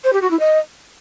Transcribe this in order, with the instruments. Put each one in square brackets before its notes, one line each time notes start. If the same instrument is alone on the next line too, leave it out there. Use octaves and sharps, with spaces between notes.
[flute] C5
G4
F#4
E4
D#5